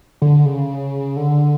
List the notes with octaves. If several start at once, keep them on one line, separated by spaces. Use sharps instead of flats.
D3
C#3
D3